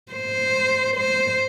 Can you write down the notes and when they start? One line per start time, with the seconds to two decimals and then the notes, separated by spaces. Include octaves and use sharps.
0.12 C5
0.96 C5